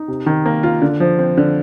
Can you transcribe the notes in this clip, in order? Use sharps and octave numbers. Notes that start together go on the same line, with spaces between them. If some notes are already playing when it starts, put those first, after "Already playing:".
Already playing: D#4
C3
D#3
A#3
F4
D3
F3
C4
D3